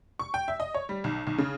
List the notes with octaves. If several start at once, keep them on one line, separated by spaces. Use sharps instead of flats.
C#6
G5
E5
D#5
C#5
G3
B1
B1
C#3